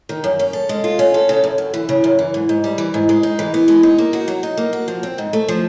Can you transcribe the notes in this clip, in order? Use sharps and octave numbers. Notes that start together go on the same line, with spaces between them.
D#3
F#2
C#4
A4
G#3
F4
C#4
A4
C#3
F#2
F#2
E3
C#3
F#2
E3
G#2
G#2
G3
E3
G#2
G#3
D#4
E3
B3
G#3
D#4
A#3
F#4
F#3
D#4
A#3
F#4
F3
C4
G#2
A3
F3